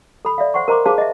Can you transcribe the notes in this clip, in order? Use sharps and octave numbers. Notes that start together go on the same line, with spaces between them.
A4 B5
D5 E5 F5
C5 F#5 C6 C#6
A#4 C5 D#5 A#5 C6 D6
D#4 G#4 C5 F5 A5 D6
D#5 E5